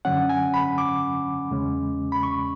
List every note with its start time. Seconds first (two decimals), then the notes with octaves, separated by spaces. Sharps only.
0.05 F#2 D3 F#3 C#4 F#5
0.29 G#5
0.54 B5
0.78 D6
1.50 E2 C#3 G#3 C#4
2.12 B5
2.23 C#6